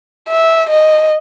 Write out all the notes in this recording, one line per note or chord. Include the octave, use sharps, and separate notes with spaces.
E5
D#5